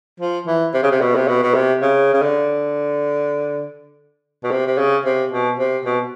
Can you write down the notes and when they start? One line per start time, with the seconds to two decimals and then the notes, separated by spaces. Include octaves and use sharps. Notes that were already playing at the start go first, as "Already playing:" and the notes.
0.20 F3
0.47 E3
0.74 C3
0.83 C#3
0.91 C3
1.01 B2
1.16 C3
1.28 B2
1.43 B2
1.54 C3
1.81 C#3
2.13 C#3
2.22 D3
4.44 B2
4.51 C3
4.67 C3
4.78 C#3
5.05 C3
5.32 B2
5.59 C3
5.86 B2